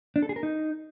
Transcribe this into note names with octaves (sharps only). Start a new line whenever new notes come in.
D4
A4
G#4
A#4
D#4